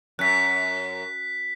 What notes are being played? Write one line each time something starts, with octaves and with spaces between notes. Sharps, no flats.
F#2 F#6 B6